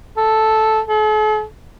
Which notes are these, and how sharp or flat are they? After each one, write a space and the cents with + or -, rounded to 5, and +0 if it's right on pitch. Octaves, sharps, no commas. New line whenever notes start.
A4 -5
A4 -45